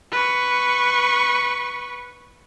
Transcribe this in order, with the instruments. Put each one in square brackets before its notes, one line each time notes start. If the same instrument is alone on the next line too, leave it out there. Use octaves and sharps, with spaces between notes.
[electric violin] B4 C#6